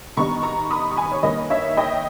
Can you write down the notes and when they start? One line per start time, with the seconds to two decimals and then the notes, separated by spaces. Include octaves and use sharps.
0.17 D#3 G3 B3 D#4 A#5 C#6
0.43 A#5 C#6
0.70 B5 D#6
0.91 C#6
0.96 G#5 B5
1.12 C#5
1.23 D#3 A#3 D#4 B4 D#5
1.50 C#5 E5
1.77 D#5 G5